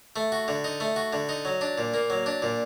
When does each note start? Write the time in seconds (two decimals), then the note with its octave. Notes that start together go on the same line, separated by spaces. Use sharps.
0.16 A3
0.32 F#4
0.48 D3
0.64 D#4
0.80 A3
0.96 F#4
1.13 D3
1.29 D#4
1.45 F#3
1.61 D4
1.78 A#2
1.94 A#3
2.10 F#3
2.26 D4
2.42 A#2